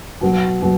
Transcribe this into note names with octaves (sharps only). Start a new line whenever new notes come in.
B2 F#3
B2 F#3